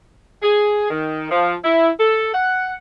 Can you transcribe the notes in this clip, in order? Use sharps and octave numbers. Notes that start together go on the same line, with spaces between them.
G#4
D#3
F3
E4
A4
F#5